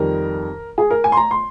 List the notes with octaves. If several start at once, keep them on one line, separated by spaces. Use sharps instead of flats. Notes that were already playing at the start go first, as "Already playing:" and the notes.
Already playing: F2 D#3 G3 A#4
G#4
A#4
G#5
C6
A#5
C6